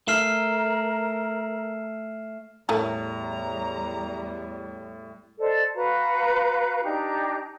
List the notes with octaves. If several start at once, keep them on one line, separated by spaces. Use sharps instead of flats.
A3 A#4 F6 C7 E7
E2 A2 G3 A3 A#4 A#5
A4 C5 D5 D#5
F#4 B4 F5 A#5
D4 D#4 G4 A#5